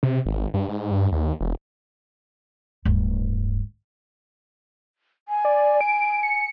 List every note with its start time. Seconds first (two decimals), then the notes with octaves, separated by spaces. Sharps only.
0.03 C3
0.26 G#1
0.54 G2
0.69 G#2
0.91 G2
1.12 D#2
1.41 E1
2.85 D1 G2
5.29 G#5
5.45 D5
5.81 D7
6.23 C#7